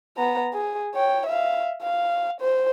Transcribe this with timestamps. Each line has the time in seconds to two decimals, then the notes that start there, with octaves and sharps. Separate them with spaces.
0.17 B3 A#5
0.53 G#4
0.95 C#5 G5
1.27 E5 F5
1.82 F5
2.41 C5